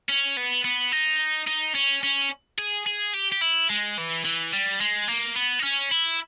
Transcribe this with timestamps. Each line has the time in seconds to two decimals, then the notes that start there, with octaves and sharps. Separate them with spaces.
0.09 C#4
0.37 B3
0.64 B3
0.92 D#4
1.47 D#4
1.75 C#4
2.03 C#4
2.58 G#4
2.86 G#4
3.14 G4
3.32 G4
3.42 E4
3.70 G#3
3.98 E3
4.25 E3
4.53 G3
4.80 G#3
5.08 A#3
5.36 B3
5.59 D#4
5.63 C#4
5.91 E4